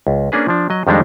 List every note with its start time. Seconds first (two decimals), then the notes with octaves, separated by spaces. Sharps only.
0.07 C#2
0.32 A#3 C#4 D4 G#4 B4
0.48 F3 D4
0.70 F#3 D#5
0.87 F2 D#3 G3 G#3 D4 D#4